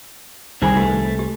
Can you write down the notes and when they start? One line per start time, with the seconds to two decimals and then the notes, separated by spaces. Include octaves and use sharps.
0.62 C2 D#3 G#4 C5 G#5 B5
0.77 A3 G4 B4
1.19 G4